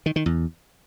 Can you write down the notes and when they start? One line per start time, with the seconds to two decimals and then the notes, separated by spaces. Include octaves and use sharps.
0.06 D#3
0.16 D#3
0.26 E2